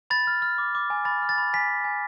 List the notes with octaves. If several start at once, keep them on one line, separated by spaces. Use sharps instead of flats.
B5 A6
F6
F6
D6
D6
G#5
B5 A6
F6
A6
B5
G#5 B6
G#5
G#5